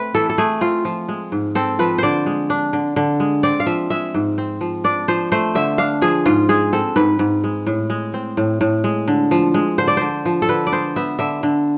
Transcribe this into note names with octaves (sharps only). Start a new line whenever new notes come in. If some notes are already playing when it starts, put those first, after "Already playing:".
Already playing: A3 C4 B4
E3 A4
A4
A3 G#4
C4 F4
F3
G#3
G#2
C4 A4
F3 B4
D3 C5 D5
G#3
D4
D3
D3
G#3
C4 D5
F5
F3 E5
G#3 E5
G#2
C4
F3
D4 D5
F3 C5
A3 C5
D3 E5
D4 F5
F3 G#4
G#2 F4
G#3 G#4
C4 A4
G#2 B4
G#2
G#3
A2
G#3
C4
A2
A2
G#3
D3
F3
G#3
D3 C5
D5
D3 C5
F3
A4
D3 B4
D5
G#3 C5
B3 E5
D3 E5
D3